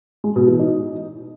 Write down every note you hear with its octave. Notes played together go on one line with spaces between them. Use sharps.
G#3
B2
E3
D#4